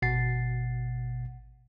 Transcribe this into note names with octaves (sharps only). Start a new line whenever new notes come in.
G#1 B2 F#5 A6 C7